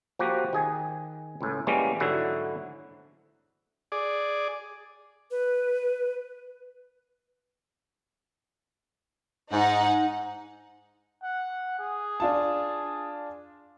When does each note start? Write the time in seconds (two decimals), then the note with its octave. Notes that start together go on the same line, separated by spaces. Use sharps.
0.19 F3 A#3 F#4 G4
0.53 D#3 G#4 G#5
1.41 C#2 A2
1.67 E3 G3 G#3 A#3 C#4
2.00 G#2 D3 F#3 E4 F#4
3.92 G#4 D5
5.31 B4
9.52 G#2 D#4 F#5
11.23 F#5
11.79 G#4
12.20 D4 F4 A5